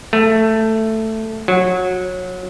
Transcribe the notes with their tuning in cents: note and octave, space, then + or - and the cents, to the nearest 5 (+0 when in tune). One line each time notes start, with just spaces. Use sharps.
A3 +5
F#3 -20